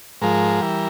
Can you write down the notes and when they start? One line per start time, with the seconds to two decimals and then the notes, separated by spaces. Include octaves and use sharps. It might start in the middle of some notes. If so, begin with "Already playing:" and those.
0.21 G#2 F3 G#3 A#4
0.61 E3 G3